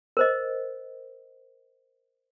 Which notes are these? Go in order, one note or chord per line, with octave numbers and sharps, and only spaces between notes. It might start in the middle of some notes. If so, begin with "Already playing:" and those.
A#4 C5 D#5